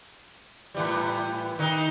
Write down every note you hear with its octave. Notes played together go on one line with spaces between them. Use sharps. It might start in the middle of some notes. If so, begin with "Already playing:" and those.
A2 E3 G3
D#3 D#4